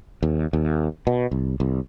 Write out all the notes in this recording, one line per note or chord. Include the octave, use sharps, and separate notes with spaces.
D#2
D#2
B2
C2
C2